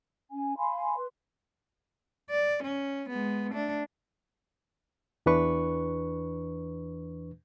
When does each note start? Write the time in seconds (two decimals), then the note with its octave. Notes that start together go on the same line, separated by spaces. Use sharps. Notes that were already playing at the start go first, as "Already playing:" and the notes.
0.31 C#4 G#5
0.57 F5 G#5 B5 C6
0.95 B4 C6
2.31 D5
2.63 C#4
3.09 G#3 B3
3.52 A3 D4
5.26 E2 E3 D4 B4 C#6